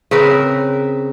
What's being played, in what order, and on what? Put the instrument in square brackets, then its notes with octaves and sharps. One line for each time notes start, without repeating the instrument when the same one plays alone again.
[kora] C#3 C4 A#4 B4